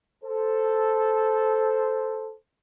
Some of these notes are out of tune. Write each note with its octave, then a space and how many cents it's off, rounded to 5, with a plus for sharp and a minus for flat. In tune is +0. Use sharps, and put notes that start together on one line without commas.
A4 -5 C5 +0